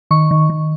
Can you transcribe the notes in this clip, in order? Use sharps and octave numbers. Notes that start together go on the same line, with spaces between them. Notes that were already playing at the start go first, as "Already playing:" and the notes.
D#3 C#6
D#3
D#3